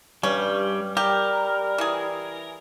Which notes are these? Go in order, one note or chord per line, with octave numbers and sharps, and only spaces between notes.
G2 G3 C#4
G3 G4 A#4
E3 G#4